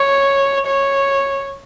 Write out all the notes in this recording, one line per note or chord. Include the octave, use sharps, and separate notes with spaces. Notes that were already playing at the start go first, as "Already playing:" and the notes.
Already playing: C#5
C#5